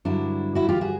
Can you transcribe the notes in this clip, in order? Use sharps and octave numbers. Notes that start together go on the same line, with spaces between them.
G2 D3 F#3 D4 E4
E4 F#4
F4 G4
F#4 G#4